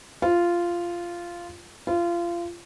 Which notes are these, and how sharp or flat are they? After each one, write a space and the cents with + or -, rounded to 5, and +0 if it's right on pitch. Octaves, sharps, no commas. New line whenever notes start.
F4 -10
F4 -25